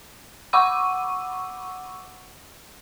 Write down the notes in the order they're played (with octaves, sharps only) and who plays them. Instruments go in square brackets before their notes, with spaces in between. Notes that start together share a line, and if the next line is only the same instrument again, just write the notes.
[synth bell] F#5 B5 C#6 D6 E6 D#7